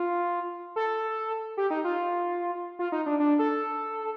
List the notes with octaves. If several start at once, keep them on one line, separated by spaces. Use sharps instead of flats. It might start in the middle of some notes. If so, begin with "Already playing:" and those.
Already playing: F4
A4
G4
D#4
F4
F4
D#4
D4
D4
A4